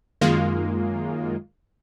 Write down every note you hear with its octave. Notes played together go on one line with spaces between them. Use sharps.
F#2 D#3 G#3 A#3 F4